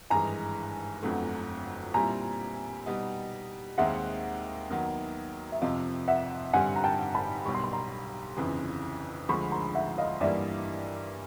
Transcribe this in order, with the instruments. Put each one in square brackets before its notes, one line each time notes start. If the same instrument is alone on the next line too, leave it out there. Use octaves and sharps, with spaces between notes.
[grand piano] G#1 G2 E3 G#3 [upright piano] G#5 A#5
[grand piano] G1 F2 D3 F#3 A3
[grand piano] A#2 G3 C4 E4 [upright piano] G#5 A#5
[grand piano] B2 G3 B3 D#4
[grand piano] D#2 D#3 G#3 C4 [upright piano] E5 F#5
[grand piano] D#2 D#3 F#3 B3
[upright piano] E5
[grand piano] F2 C3 F3 [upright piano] D#5 F5
[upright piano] E5 F#5
[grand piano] G2 D3 G3 C4 [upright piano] F#5 G#5
[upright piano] A#5
G5 A5
A5 B5
[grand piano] B1 B2 G3 [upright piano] C#6
[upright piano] C6
B5
A#5 C6
[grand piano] G1 F2 C#3 E3
[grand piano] D2 D3 F3 G#3 [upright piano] B5 C#6
[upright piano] A#5 C6
E5 F#5
D#5 F5
[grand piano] G2 E3 G3 A#3 [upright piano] D5 E5